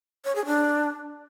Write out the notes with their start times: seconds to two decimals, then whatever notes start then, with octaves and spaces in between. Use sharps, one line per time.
0.25 C#5
0.35 G#4
0.46 D4